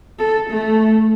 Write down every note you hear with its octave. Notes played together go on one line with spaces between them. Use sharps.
A4
A3